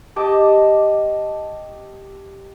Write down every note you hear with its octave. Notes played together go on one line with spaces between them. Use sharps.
G4 D#5 A5 D6